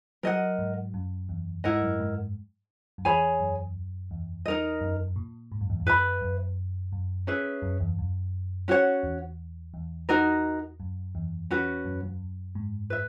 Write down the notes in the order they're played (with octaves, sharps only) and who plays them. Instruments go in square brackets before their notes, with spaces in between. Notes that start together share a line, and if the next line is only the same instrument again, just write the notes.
[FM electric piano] F#3 [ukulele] A#4 D#5 F#5
[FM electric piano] G#2
F#2
E2
[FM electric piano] G#2 [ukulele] E4 A#4 D#5 F#5
[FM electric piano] F#2
G#2
F#2
[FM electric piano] E2 [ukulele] G#4 C#5 G#5 B5
[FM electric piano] F#2
E2
[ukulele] D#4 A#4 D#5
[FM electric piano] F#2
A#2
G#2
F#2
E2
F#2
[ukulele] B4 E5 B5
[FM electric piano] F#2
F#2
[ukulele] C#4 G#4 B4 E5
[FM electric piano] F#2
E2
F#2
[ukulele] C#4 F#4 C#5 F#5
[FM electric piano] E2
E2
[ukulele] D#4 F#4 A#4 D#5
[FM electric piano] F#2
E2
[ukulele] C#4 F#4 B4
[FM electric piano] F#2
F#2
G#2
[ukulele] B4 E5